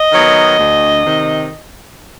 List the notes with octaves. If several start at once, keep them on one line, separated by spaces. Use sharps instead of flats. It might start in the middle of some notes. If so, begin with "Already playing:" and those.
Already playing: D#5
D#3 F#3 B3
D2
C3 D#3